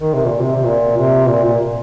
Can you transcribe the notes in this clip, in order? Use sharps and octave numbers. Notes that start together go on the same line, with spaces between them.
D#3
C3
A#2
C3
C3
A#2
C3
A#2
A#2